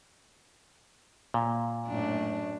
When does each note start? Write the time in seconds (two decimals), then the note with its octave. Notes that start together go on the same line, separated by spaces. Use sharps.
1.34 A#2
1.87 F#2 A2 D4